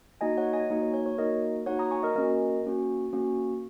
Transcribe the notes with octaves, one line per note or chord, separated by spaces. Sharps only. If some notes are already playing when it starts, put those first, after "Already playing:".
A#3 D#4 F#4 D#5 G#5
C#5 F#5
D#5 G#5
A#3 D#4 F#4
C#5
C#5
C#5
A#3 D#4 F#4 A#4 D#5
A#3 D#4 F#4 C#5 F#5
A#5 D#6
G#5 C#6
A#4 D#5
A#3 C#4 F#4 A#4 D#5
A#3 C#4 F#4
A#3 C#4 F#4